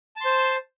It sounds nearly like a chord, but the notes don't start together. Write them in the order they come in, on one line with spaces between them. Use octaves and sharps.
A5 C6 C5